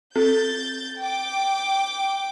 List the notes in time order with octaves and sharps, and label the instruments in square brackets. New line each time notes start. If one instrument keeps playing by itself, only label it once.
[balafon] C4 A4 [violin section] G6 A6
[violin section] G5 D6